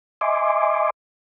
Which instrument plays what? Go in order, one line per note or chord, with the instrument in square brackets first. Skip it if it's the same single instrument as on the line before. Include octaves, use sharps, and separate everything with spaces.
[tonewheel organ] D#5 E5 G#5 C6 D6